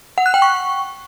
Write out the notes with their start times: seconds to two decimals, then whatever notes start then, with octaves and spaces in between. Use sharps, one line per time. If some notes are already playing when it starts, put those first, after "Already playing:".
0.18 F#5
0.26 F#6
0.34 G5
0.42 C#6